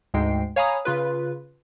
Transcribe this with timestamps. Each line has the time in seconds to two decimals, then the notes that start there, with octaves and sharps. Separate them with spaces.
0.14 D2 G#2 G#3 G5 C7
0.56 C#5 F5 G#5 A#5 B5 D#6
0.85 C#3 F4 B4